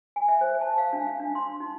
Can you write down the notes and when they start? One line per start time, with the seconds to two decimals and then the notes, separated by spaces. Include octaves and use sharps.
0.16 G#5
0.28 E5
0.41 C5
0.61 A5
0.78 F5
0.93 D4
1.07 F5
1.20 D4
1.35 C6
1.60 D#4